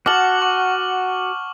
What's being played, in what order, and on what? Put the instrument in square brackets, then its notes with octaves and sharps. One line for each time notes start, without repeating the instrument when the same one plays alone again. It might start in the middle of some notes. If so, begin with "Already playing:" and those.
[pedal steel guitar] F#4 [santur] F#5 A5 [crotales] D6 F6 F#7
[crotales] C#6